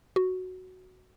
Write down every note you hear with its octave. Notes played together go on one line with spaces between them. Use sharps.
F#4